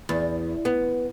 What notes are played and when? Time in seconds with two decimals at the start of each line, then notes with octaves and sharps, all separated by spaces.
0.09 E2
0.65 B3